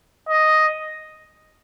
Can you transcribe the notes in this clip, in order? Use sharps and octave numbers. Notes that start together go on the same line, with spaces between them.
D#5